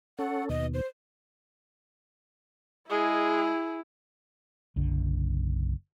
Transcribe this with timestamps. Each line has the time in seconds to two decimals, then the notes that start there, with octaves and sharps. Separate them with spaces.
0.19 C#4 A4 F#5
0.49 D#2 B2 D#5
0.74 C5
2.90 G#3 E4 G#4
4.76 F#1 B1 D3